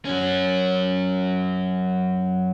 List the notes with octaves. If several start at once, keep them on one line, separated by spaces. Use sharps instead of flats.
F#3 C#4